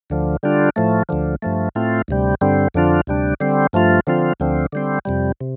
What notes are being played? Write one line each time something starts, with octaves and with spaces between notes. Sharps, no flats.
D2 D3 F3
D3 G3 D4 F4
A2 F3 A3
D2 D3 F3
G2 F3 A3
A2 A3 C4 F4
D2 C3 G3
G2 D3 G3 C4
F2 D3 F3 D4 F4
D2 C3 G3 D4
D3 G3 C4
G2 F3 A3 F4
D3 F3 C4 F4
D2 D3 F3 C4
D3 G3 C4
F2 C3 G3
C3